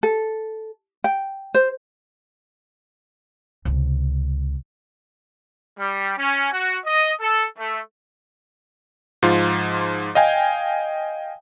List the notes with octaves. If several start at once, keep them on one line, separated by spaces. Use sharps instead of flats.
A4
G5
C5
C#2 C3
G3
C#4
F#4
D#5
A4
A3
G#2 F3 F4
D#5 F5 G5 G#5